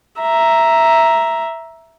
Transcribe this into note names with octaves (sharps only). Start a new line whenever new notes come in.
E5 A#5